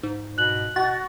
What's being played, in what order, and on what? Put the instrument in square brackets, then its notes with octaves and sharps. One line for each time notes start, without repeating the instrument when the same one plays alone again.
[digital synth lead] G#2
[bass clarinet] B2 [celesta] F#6 F#7
[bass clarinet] B2 [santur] F#4 [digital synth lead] A6